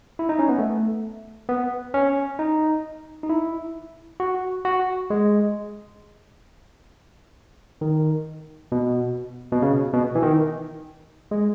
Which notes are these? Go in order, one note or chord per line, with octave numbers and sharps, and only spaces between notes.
E4
D#4
C#4
B3
A3
B3
C#4
D#4
D#4
E4
F#4
F#4
G#3
D#3
B2
B2
C#3
B2
E3
D#3
G#3